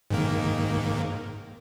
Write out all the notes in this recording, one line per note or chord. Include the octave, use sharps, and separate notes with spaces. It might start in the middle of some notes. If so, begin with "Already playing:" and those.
G#2 D#3 A#3